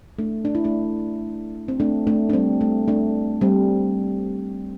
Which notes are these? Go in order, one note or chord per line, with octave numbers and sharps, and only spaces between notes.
A3 D4
D4
E4
A3 D4
C4
A3 D4
A3 D4
D4
G3 C4
A3
A3 D4
G3 C4